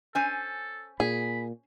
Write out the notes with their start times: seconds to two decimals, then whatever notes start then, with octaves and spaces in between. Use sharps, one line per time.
0.15 C#4 A4 C5 G#5
1.00 A#2 G#4 B5